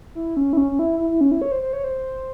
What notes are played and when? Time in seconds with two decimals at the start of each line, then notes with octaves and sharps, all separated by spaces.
0.15 E4
0.37 C#4
0.53 E4
0.57 C#4
0.71 C#4
0.79 E4
0.99 E4
1.10 E4
1.21 C#4
1.31 E4
1.42 C#5
1.52 C5
1.62 C5
1.73 C#5
1.84 C5